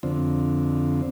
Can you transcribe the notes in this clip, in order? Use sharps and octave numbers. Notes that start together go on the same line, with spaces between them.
F2 D3 C4